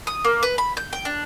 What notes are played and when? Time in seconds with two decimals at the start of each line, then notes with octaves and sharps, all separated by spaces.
0.07 D#6
0.25 A#3
0.43 B4
0.58 B5
0.77 G6
0.93 G5
1.05 D4